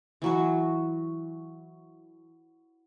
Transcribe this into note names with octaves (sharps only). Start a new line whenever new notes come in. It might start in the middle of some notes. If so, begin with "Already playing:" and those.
E3 F#3 F#4